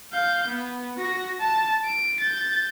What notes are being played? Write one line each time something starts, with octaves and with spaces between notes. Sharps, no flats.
F5 G6
B3
F#4 A#6
A5
D7
G6 A6